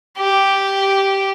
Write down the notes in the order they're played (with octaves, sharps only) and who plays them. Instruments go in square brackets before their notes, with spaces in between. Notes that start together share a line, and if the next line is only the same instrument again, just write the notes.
[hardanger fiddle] G4